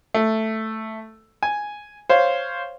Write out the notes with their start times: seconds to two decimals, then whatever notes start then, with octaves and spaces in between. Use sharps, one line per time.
0.14 A3
1.43 G#5
2.09 C5 C#5 F5